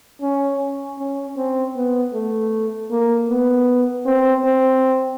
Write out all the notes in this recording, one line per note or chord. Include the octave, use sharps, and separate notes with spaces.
C#4
C#4
C4
B3
A3
A#3
B3
C4
C4